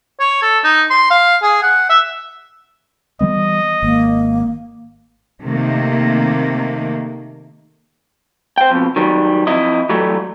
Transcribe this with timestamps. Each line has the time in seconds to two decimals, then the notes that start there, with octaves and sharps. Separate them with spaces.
0.20 C#5
0.42 A4
0.64 D#4
0.90 C6
1.10 F5
1.43 G#4
1.63 F#5
1.90 E5
3.21 E3 G3 B3 D#5
3.83 G#1 A#3
5.43 C3 D#3 A3 A#3
8.58 C5 G5
8.71 F2 B2
8.96 D#3 F#3 G3
9.47 F2 E4 D#5
9.89 E3 F#3 G3 A3